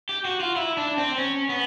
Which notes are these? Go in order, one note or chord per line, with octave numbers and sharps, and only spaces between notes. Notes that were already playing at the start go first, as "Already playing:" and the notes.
G4
F#4
F4
E4
D4
C4
C#4
B3